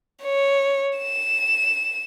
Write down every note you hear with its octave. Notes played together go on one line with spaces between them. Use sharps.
C#5
E7